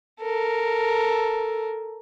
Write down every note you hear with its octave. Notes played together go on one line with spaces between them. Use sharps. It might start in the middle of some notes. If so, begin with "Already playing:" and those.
A4 A#4